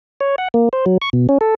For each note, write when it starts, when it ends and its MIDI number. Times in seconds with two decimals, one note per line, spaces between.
0.21 0.36 73
0.38 0.48 78
0.54 0.69 58
0.73 0.85 72
0.86 0.98 54
1.02 1.10 85
1.13 1.27 47
1.29 1.38 61
1.41 1.55 69